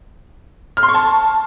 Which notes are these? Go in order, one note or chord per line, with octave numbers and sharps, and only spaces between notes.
F6
C6
C#6
A5